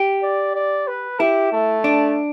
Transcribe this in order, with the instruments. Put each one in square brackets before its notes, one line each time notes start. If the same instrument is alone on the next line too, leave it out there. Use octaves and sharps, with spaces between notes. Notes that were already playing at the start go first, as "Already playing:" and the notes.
Already playing: [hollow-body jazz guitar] G4
[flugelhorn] D5
D5
B4
[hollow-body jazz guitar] E4 [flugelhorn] G4
[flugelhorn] A3
[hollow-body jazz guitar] D4